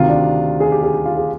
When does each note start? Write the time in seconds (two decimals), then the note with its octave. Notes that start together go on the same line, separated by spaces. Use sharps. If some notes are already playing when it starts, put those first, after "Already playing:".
Already playing: D2 C3 D#3 F4
0.09 D4
0.60 G#4
0.72 G4
0.83 G#4
0.94 G4
1.06 F4
1.17 G#4